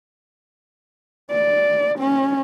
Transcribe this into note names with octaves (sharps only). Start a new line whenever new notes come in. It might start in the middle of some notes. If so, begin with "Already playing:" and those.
D5
C#4